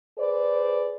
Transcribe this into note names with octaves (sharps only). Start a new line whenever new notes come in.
G#4 B4 C5 D5